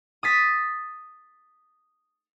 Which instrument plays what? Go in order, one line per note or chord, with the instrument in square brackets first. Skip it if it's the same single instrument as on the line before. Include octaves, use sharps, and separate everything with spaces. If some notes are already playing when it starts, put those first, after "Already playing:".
[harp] D#6 A6 B6